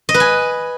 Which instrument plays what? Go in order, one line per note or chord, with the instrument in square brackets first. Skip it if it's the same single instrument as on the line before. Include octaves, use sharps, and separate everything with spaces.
[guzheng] D#5
B4
G#5